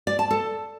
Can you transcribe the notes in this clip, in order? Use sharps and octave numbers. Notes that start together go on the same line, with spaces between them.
D5
A5
A4